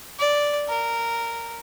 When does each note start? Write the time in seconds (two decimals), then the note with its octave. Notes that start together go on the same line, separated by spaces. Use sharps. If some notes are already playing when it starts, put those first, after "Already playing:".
0.19 D5
0.68 A#4